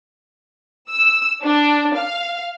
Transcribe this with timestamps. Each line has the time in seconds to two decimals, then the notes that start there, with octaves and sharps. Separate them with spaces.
0.90 E6
1.43 D4
1.95 F5